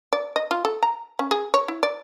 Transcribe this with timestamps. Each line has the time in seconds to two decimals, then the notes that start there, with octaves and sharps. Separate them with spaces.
0.13 D5
0.36 D#5
0.51 F4
0.65 A4
0.83 A#5
1.19 C#4
1.31 G#4
1.54 C#5
1.68 E4
1.83 D5